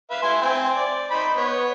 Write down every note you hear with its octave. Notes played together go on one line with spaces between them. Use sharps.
B4 E5 F5
E4 G#5 C6
C4 G#5 C6
D5
D#4 C5 B5
B3 C#5